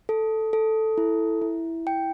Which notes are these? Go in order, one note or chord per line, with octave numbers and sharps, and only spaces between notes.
A4
A4
E4
E4
G5